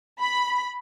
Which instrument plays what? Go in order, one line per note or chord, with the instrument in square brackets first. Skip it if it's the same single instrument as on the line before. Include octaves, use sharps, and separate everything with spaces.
[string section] B5